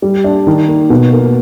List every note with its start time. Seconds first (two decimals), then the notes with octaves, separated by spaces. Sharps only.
0.02 G3
0.24 D4
0.47 D#3
0.68 A#3
0.90 B2
1.12 A#3